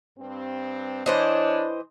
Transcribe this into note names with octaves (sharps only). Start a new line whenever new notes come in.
G2 C4
E3 D4 C5 C#5 D#5